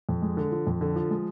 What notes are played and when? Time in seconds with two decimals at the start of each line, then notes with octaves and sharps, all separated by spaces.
0.09 F2
0.22 G#3
0.37 D3
0.52 F3
0.67 F2
0.81 D3
0.96 F3
1.10 G#3